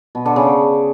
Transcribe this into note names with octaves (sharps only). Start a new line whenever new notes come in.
B2
D3
C#3